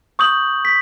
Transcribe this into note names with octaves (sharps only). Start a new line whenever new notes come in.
C#6 D#6 G6 F#7
B6